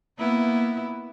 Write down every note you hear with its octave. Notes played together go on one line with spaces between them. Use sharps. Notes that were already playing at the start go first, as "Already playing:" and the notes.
A#3 B3 E4